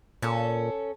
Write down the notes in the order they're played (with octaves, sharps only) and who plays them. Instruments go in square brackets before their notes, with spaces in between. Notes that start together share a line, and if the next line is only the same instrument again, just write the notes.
[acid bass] A#2 [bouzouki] C#4 A4